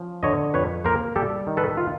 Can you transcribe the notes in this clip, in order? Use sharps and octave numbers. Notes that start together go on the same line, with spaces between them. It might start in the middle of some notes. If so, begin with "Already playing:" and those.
Already playing: F3 C#4
D3 C#5 D#5
F2 B4 C#5
A#3 A#4 C5
G3 G4 A4
D#3
A4 B4
F4